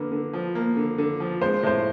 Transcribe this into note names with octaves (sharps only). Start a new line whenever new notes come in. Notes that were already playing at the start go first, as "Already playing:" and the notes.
Already playing: D3 A#3 B4
D3
F3
A#3
D3
D3
F3
G#3 C5
A2 C5